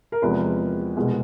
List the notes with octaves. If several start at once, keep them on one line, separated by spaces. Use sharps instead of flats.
A#4
E2 C3 F3 G#3 B4
C2 B2 G#3